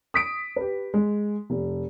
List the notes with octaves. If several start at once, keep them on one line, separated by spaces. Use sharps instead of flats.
D#6 B6 D7
G4 B4
G#3
F1